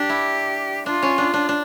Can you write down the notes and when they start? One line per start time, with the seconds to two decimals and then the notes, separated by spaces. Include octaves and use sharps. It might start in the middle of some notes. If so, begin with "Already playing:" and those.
Already playing: D4 G4
0.09 E4
0.86 D4 F4
1.02 C#4
1.18 D4
1.34 D4
1.49 D4